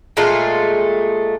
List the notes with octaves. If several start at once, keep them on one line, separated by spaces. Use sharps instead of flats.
A#2 G#3 A3 F4